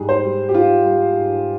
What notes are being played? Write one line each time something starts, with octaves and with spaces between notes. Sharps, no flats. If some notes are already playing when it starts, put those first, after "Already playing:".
Already playing: G#2 G3 G#4
C5
G3
G4
G#2 F4
G3
G#2